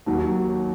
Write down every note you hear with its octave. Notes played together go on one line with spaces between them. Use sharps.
D#2 D#3 F#3